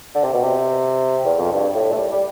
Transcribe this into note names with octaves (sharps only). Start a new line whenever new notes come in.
D3
C3
B2
C3
E2
F2
G2
A2
A3
G3
G3